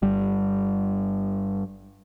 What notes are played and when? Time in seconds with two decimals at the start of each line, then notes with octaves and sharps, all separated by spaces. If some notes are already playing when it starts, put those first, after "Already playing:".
0.02 G1 G3